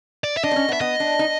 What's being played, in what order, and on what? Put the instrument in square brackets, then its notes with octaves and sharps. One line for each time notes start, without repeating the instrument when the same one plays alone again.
[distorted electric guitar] D5
E5
[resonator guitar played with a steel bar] D4 [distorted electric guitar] D#5
[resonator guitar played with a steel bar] C4
C#4
B3
[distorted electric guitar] E5
[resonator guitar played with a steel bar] B3 [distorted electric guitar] D#5
[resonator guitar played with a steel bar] D4
D#4